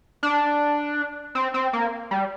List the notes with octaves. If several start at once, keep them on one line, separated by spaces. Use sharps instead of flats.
D4
C4
C4
A#3
G3